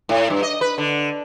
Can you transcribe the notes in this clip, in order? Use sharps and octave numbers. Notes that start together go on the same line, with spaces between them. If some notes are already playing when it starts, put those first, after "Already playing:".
A2
G2
D#5
B4
D3